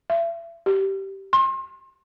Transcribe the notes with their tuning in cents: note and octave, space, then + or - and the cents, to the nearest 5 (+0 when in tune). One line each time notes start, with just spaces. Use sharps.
E5 +35
G4 -15
C6 +35